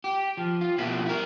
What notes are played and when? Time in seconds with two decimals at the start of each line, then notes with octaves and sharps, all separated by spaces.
0.04 G4
0.37 F3
0.61 F4
0.78 B2 F3 A#3 E4 F#4 G4
1.06 E4 A#4